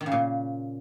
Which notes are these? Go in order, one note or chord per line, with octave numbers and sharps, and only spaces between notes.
D#3
C#3
A#2